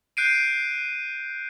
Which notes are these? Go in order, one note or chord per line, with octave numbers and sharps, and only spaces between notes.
F#6 G6 C7 D7 D#7